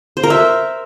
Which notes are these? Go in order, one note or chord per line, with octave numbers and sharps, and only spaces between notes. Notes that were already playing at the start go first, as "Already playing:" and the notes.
C5
A#4
E5